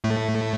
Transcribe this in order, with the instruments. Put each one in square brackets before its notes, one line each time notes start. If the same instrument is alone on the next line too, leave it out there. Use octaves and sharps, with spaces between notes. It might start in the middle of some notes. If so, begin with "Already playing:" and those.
[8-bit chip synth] A2 A3